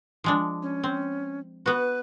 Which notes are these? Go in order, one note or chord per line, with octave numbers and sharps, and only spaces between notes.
F3 G#3 D4
C#4
C4
B3 F#4 B4